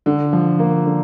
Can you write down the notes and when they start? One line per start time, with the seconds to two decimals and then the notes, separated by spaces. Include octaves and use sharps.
0.06 D3
0.33 F3
0.59 A#3
0.85 D3